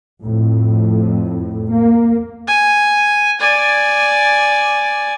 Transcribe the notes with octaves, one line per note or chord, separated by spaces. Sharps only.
F2 A2
A#3
G#5
D5 G#5